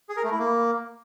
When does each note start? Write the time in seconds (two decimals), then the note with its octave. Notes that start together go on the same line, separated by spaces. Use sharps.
0.09 G#4
0.17 A#4
0.24 A3
0.31 E4
0.39 A#3